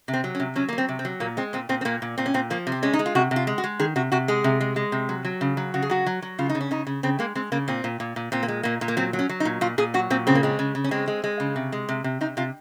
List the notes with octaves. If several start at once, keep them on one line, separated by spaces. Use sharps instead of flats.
C3
C4
F#3
C#4
C3
F#3 C#4
F#3 A#3
C4
C3
C4
F#3
A#2 A#3
G#3 C4
A#2 C4
A#2 C4
C4
A#2 A#3
A#2
A#2 C4
C#4
A#2 C4
F3 A#3
C3
C4
G#3 C#4
D#4
G#3
F4
C3 F#4
C3
F4
G#3
F#4
G#3
D#3 G#4
C3 F#4
C3 F#4
G#3 G#4
C3
G#3
G#3
C3
F#3
F#3
C#3
F#3
C#3 F#4
G#4
F#3 F#4
F#3
F#3
C#3 F4
D#4
C#3
C#4
C#3 D#4
C#3
C#3 C4
G#3 A#3
G#3 C4
C#3 A#3
A#2 C4
A#2
A#2
A#2
A#2 C4
A#3
G#3
A#2 A#3
A#2
A#3
F#3 C4
F#3
C#4
F#3
D#4
A#2
A#2 F4
A#2 G#4
F#3 F#4
A#2 C4
C#3 C4
A#3
G#3 C4
C#3
C#3
C#4
G#3 C4
G#3
G#3
C#3
C3
G#3
C3
C3
C3 D#4
C3 F4